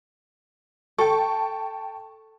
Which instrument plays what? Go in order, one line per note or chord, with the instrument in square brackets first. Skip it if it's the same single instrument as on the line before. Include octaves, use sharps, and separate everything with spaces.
[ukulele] A4 [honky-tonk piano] G5 A5 C#6